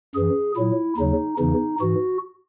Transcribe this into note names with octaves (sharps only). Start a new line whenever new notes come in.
F#2 E3 G#4
A#2 F#3 E4
D#2 C#3 F#3 D#4
E2 C#3 E3 D#4
G#2 E3 F#4